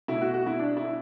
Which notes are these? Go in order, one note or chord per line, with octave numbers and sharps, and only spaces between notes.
B2 A3 E4
F#4
F#4
E4
D4
E4